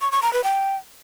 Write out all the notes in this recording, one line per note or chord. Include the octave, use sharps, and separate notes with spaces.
C#6
C#6
A#5
B4
G5